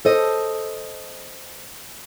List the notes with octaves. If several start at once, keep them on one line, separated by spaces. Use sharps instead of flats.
A4 C5 D#5